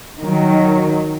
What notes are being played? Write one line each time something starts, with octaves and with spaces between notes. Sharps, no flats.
D#3 F#3